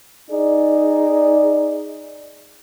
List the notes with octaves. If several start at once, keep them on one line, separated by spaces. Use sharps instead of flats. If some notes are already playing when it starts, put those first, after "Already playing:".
D#4 G#4 D5